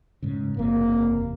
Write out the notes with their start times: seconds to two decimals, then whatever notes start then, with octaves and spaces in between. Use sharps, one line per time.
0.22 G#2 C#3
0.57 F#1 E2 C3 A#3